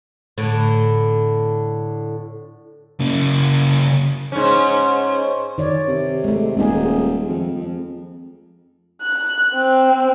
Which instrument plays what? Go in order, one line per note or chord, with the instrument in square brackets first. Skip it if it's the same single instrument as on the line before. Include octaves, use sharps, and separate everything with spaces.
[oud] A2 D3
[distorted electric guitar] C#3 A#3
[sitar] G#2 C#4
[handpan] D#3 C#5 D5
[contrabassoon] C3
[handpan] G#3 A3
[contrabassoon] D#1 [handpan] G#3 D#4 G#4
[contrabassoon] F2
F2
[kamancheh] F#6
C4